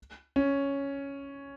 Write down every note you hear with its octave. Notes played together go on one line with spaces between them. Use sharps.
C#4